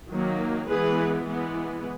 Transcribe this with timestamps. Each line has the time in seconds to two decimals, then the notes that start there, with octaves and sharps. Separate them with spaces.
0.10 D#3 F#3 A#3
0.69 E3 G#3 B3 G#4 B4
1.27 E3 G#3 B3